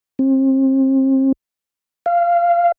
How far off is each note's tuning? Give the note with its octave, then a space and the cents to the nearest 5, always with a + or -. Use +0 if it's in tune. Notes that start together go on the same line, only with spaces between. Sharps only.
C4 +35
F5 -15